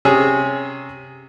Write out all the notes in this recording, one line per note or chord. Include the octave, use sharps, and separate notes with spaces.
C3 C#4 G#4